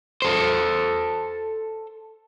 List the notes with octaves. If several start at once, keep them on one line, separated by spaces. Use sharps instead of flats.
A4 C5